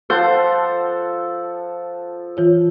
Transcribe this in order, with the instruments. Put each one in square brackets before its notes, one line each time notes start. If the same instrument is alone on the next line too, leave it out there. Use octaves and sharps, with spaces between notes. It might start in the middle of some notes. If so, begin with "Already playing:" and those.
[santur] F3 A4 F#5 [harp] C5
[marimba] E3 F4 C#5